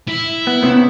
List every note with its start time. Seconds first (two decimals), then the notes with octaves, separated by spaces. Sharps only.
0.08 E4
0.47 B3
0.63 C3 B3 C#4